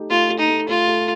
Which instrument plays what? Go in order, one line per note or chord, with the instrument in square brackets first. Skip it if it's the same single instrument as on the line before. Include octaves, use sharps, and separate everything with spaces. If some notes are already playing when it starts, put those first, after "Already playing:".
Already playing: [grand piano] A3 D#4 G4
[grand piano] A3 [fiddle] F4
[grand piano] A3
[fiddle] D#4
[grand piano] A3
[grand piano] A3 [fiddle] F4
[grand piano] A3